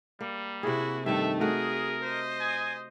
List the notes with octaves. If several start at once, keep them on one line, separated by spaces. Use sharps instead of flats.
G3 A#3
C3 E4 F#4 G#4
G2 D#3 A3 A4 E5
A3 F#4 G#4 A#4
C5 D#5
G#5